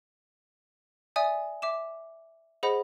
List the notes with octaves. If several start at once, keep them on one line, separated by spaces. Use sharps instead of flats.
D5 E5 G#5 D#6
E5 D6 E7
G#4 C5 D#5 F#5 B5